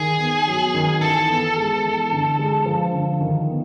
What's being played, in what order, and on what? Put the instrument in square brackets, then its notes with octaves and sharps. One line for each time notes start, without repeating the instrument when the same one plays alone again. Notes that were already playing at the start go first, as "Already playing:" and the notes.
Already playing: [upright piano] D#3 [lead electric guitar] G#4
[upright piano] B3
F#3
D#3
[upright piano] E3 [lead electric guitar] A4
[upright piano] B3
G#3
E3
D3
G#3
F3
D3
D#3
B3